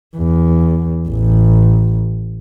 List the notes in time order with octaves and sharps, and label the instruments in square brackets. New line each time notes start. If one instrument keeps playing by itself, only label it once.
[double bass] E2
A1